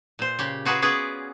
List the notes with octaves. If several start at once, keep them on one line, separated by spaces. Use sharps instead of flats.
A#2 C5
C#3 G4
F4 F#4 G#4 A#4 B4
B3 C#4 G#4 B4 D5